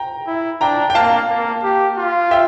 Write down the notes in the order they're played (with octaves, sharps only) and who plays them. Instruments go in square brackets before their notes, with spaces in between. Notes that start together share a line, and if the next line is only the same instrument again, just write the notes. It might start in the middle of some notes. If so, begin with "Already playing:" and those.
Already playing: [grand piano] G5 A#5
[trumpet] E4
[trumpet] D4 [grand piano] G5 A#5
[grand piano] G5
[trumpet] A#3 [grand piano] F5 A5
[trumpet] A#3
G4
F4
[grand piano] E5 G5